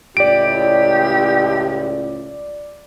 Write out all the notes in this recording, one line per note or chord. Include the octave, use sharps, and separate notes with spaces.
C#2 A2 G4 D5 D7